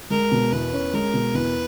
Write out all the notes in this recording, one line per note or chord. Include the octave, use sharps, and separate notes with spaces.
G#3 A#4
B2
E2 B4
C#4
G#3 A#4
B2
E2 B4